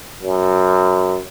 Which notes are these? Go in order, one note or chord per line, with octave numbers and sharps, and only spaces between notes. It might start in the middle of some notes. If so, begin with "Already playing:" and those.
F#2